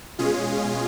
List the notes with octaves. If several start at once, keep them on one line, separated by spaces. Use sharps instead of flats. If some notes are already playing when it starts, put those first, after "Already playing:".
B2 G#3 C#4 F4 G#4